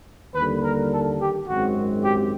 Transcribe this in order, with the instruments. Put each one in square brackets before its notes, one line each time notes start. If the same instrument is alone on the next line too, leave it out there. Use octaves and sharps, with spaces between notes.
[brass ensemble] D#2 D3 G3 A#3 B4
A#4
A4
G4
G#1 F#2 D#3 G#3 C4 F#4
G4